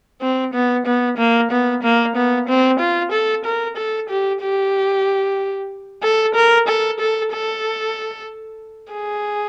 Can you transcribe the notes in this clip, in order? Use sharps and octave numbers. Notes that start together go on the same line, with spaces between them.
C4
B3
B3
A#3
B3
A#3
B3
C4
F4
A4
A#4
A4
G4
G4
A4
A#4
A4
A4
A4
G#4